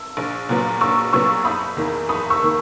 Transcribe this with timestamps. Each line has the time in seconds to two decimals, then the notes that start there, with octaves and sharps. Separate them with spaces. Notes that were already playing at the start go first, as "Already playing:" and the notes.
Already playing: E6
0.17 A#1
0.49 A#2 F#3 B3
0.81 A#1 C#6 E6
1.13 A#2 F#3 B3 C#6 E6
1.45 F#1 B5 D#6
1.77 E2 D#3 A#3
2.09 F#1 B5 D#6
2.30 C#6 E6
2.42 D#3 A#3